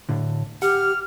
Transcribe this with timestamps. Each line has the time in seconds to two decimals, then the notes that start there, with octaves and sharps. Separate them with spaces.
0.09 A2 D3
0.62 G4 F#5 F6